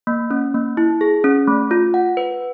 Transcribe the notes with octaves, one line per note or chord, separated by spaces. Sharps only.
A#3
C#4
A#3
E4
G#4
C#4
A3
F4
F#5
B4